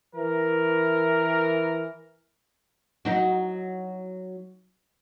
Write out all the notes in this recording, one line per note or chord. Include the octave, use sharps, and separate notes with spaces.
E3 A#4
F#3 D#4 F#4